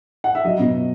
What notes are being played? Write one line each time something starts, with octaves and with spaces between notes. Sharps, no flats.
F#5
E5
F#3 D#5
B2